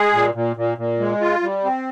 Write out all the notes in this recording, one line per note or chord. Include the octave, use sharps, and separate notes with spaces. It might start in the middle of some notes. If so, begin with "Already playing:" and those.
Already playing: G#3 G#4
A#2
A#2
A#2
A#2
G#3
F4
G3
C4